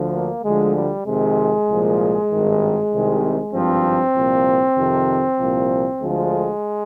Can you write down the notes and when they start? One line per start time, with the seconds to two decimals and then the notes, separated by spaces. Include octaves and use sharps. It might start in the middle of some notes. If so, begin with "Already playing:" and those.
Already playing: D2 D3 F3
0.12 A#3
0.43 D2 D3 F3 G#3
0.74 G3
1.05 F2 C3 D#3 G#3
1.67 C2 A#2 F3
2.29 G#1 G2 D#3
2.91 C2 C3 D#3
3.53 G#1 G2 F3 C4
4.15 C2 A#2 F3
4.77 F2 C3 D#3
5.39 C2 A#2 F3
6.01 D2 D3 F3 G#3